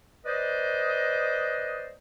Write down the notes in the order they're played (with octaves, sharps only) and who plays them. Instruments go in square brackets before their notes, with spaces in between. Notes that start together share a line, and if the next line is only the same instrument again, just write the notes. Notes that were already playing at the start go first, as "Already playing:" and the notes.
[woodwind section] B4 C5 D5 D#5